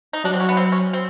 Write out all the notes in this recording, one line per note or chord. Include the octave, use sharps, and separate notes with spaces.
D#4
F#3 D4
C4
C#4
B3
C4
C#4
C4